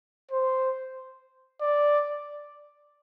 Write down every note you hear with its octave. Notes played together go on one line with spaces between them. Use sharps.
C5
D5